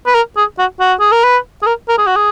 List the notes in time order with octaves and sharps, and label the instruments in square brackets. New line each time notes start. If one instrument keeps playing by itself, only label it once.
[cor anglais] B4
A#4
G#4
F#4
F#4
G#4
A#4
B4
G#4
A#4
A#4
G#4
F#4
G#4